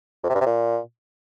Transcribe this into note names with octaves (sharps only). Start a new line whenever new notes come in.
F2
C3
G2
C3
A#2